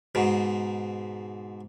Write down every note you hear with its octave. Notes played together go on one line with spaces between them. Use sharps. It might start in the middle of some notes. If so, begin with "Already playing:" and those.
G#2 B2